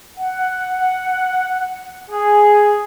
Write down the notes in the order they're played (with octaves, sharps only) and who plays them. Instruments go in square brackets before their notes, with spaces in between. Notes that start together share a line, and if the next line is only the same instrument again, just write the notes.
[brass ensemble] F#5
G#4